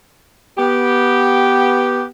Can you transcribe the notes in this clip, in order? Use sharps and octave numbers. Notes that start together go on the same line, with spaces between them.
B3 G4